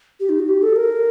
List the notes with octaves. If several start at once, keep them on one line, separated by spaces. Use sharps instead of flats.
G4
D#4
F#4
G4
A4
A#4